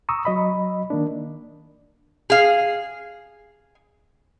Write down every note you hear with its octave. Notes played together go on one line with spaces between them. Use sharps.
A#5 C#6 D#6 E6
F#3 D#5 B5
D#3 A#3 D4
G#4 F5